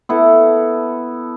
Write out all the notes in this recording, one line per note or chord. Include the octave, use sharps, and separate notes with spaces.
B3 E4 A4 A5